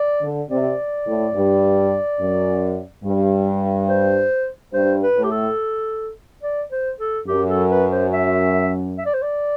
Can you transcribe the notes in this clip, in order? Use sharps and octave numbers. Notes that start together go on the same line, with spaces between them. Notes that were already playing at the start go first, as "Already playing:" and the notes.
Already playing: D5
D3
C3 D5
A2
G2
F#2
G2
C5
G2 C5
B4
A2
G4
A4
D5
C5
A4
F#2 G4
A4
B4
C5
E5
E5
D5
C5
D5